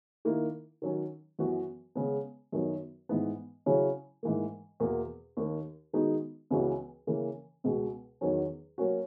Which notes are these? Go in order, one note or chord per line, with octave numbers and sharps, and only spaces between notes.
D#3 A#3 E4
D#3 F#3 C#4
F#2 E3 B3 F#4
C#3 G#3 B3
F#2 D#3 F#3 B3
G#2 E3 B3
C#3 F#3 C#4 E4
G#2 E3 A#3
E2 B2 A#3
D#2 D#3 A#3
D#3 G#3 B3 D#4 F#4
C#2 C#3 E3 B3 F#4
C#3 E3 A#3
C#2 B2 G#3
E2 D#3 F#3 C#4
F#3 A#3 C#4 F#4